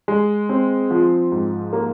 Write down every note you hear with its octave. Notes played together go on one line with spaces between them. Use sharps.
G#3
C4
F3
G#2
A#3